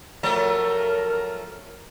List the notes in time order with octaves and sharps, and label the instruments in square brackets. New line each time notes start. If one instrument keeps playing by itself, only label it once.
[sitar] F3 F#3 A3 [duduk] A#4